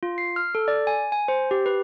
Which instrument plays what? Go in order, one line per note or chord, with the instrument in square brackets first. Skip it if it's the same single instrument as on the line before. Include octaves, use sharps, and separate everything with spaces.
[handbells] F4
C7
F6
A4
D5
G#5
G#5
C5
G4
B4